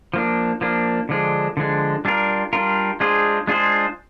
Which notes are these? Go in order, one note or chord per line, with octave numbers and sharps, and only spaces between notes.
F3 A#3 D4
F3 A#3 D4
D3 F3 G#3 D4
D3 F3 G#3 D4
G3 D4 F4 A#4
G3 D4 F4 A#4
G#3 D4 F4 G#4 C5
G#3 D4 F4 G#4 C5